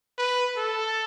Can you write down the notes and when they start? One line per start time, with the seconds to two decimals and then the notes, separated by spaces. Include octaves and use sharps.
0.18 B4
0.56 A4